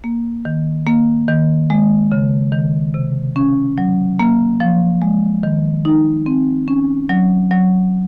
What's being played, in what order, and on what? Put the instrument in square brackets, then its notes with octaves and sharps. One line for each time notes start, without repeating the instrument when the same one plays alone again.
[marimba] A#3
D#3
A#3
D#3
G#3
C#3
D#3
C3
C#4
F#3
A#3
F3
G#3
D#3
D#4
C4
C#4
F#3
F#3